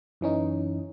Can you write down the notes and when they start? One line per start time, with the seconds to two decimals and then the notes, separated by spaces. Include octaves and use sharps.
0.21 F#2 E3 C#4 D#4